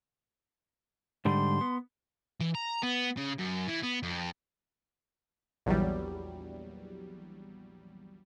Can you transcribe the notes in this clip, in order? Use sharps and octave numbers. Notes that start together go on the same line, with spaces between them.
G#2 D3 G3 C6
B3
E3
A#5
B3
C#3
F#2
E3
B3
F2
A#1 E2 F#3 G3